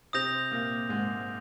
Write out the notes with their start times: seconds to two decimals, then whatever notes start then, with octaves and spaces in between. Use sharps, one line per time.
0.13 C3 C4 D#6 G6 A#6 F7
0.51 A#2 A#3
0.89 G#2 G#3